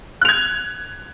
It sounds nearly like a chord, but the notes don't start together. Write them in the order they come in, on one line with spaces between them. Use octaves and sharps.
F#6 F7 G#6